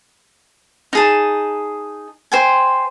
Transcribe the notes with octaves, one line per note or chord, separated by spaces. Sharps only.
D#4 G#4 A5
C5 G5 G#5